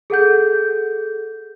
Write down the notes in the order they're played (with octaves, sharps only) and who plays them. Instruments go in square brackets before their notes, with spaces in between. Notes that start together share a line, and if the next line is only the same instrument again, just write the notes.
[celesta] G#4 A4 F#5 G6